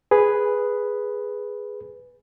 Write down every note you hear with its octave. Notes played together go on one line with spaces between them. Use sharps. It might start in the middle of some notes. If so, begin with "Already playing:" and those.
G#4 B4